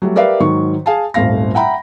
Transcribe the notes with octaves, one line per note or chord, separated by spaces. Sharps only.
F#3 G3 A3
G4 A#4 B4 D5 E5 F5
G#2 D#3 F#3 C#6
G#4 F5 G#5 A5
D#1 G#1 A3 F5 A#6
E5 F#5 G5 A#5 B5